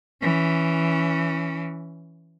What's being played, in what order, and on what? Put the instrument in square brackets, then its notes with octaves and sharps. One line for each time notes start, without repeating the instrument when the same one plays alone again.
[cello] E3 C#4